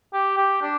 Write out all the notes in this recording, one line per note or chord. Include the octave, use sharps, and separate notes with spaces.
G4
G4
D4